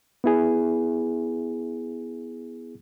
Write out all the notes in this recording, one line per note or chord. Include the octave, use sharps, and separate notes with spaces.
B3 E4 G#4